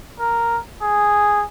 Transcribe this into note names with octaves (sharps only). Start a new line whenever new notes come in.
A#4
G#4